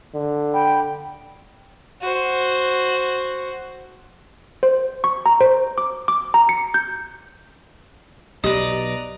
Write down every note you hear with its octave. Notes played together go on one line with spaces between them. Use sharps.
D3
G5 B5
F#4 C5
C5
C#6
A#5
C5
D6
D6
A#5
C#7
G6
B1 G4 B4 D5 D#5 A#5